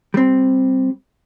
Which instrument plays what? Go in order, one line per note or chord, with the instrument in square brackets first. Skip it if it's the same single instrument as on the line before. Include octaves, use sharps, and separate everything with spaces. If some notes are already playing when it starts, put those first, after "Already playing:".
[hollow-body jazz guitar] G3 C4